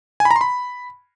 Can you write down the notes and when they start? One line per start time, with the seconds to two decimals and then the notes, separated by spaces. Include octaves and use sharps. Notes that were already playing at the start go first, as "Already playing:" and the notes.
0.20 G#5
0.25 B5
0.31 A#5
0.36 C6
0.41 B5